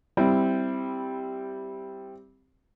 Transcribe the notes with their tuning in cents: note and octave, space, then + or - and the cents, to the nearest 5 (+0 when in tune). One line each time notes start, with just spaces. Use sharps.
G3 +0 C4 +0 E4 +0